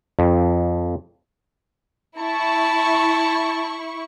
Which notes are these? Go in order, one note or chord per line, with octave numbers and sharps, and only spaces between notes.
F2
E4 A5 C#6